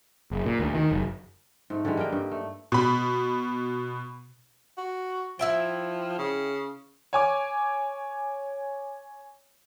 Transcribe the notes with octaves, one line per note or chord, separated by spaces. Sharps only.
F#1
A#2
D2
D#3
F#1
G#2 A3
D3 E3 G3 G#3
A#3 D4 D#5 G5
G2
A3
B2 B5
F#4
F3 E4 E5 G5
C#3
C#5 G#5 D6